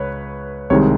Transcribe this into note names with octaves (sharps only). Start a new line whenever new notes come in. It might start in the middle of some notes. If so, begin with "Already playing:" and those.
Already playing: C#2 B4 C#5
C2 C3 D#3 G#3 C#5